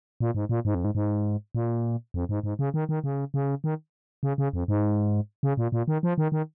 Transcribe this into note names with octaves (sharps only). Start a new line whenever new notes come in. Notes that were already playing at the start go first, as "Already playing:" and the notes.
A#2
G#2
A#2
G#2
F2
G#2
G#2
A#2
F2
G#2
G#2
C#3
D#3
D#3
C#3
C#3
D#3
C#3
C#3
F2
G#2
C#3
A#2
A#2
D#3
F3
D#3
D#3